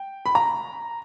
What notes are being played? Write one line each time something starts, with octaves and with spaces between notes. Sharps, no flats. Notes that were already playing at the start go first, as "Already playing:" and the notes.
Already playing: G5
B5
A#5